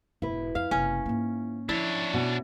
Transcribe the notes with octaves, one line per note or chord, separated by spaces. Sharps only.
E1 G#2 E4 B4
F2 F5
F#1 C3 C#4
G#2 A#3
F3 D4 E4 C#5
B2